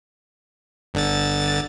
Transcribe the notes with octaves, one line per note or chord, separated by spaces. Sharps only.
G1 D3 A6